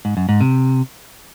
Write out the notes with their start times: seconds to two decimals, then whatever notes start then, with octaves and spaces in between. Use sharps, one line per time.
0.05 G#2
0.17 F#2
0.29 G#2
0.41 C3